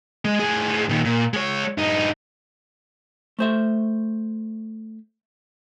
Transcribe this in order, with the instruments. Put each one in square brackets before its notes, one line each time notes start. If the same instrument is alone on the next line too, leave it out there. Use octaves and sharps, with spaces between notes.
[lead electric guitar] G#3
A2 G#4
A#2 D#3
A#2
G#3 C#5
G2 D#4
[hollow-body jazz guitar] A3 C5 E5